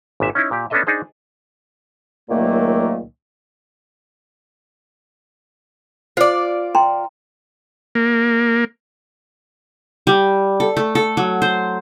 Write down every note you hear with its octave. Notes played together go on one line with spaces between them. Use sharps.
G#1 A#2 E5
C#4 D#4 E4
A#2 G4
B3 C#4 D4 A4 D#5 E5
D4 D#4 G#4 C5
C#2 A#2 D#3 F#3 A3 A#3
F4 C5 D5
G5 A#5 C6
A#3
G3
A4
A3
A4
F#3
C5